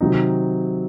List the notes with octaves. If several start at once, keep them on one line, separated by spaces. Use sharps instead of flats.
C3 D#3 F#3 C4 D#4